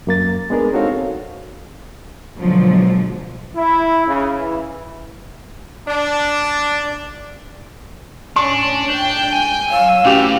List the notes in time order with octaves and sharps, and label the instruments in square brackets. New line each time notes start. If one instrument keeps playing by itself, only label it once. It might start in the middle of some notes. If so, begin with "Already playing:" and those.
[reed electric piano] F#2 A#3 A6
G#3 B3 D4 G#4 A#4
C4 D#4 F#4 A4 C#5 F5
[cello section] B2 D3 F3 F#3 G#3
[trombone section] E4
C#3
E3
[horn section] D4
[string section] A2 C#4 [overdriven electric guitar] D4 [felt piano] C#6
[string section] G#2 G5 G6
[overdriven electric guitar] G#5
[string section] F#3 C#5 E6 [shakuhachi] F5
[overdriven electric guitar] A2 [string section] E3 [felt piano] C#4 F#4 G4